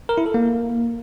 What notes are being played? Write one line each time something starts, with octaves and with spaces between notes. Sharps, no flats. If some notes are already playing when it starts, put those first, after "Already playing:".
A#4
E4
A4
A#3